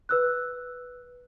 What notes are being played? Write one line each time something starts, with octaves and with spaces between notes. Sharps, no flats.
B4 E6 F#6